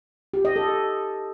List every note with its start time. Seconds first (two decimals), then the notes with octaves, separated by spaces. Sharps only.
0.34 G4
0.45 D#5
0.56 A4